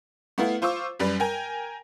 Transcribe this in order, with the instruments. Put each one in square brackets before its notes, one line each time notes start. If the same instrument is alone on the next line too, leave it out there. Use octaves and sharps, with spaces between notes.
[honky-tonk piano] A3 B3 E4 F5
F4 C5 C#6 D6 E6
F#2 G3 B4
A#4 G5 G#5